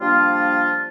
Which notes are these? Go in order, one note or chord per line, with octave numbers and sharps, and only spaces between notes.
F3 G3 A#3 D4 F4